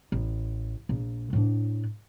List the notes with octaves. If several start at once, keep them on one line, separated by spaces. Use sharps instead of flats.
A1
A#1
A2 D4